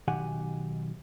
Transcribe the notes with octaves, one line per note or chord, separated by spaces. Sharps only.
B1 D#3 G4 F#5 G#5